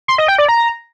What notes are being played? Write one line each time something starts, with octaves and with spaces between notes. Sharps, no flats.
C6
D#5
G5
D5
A#5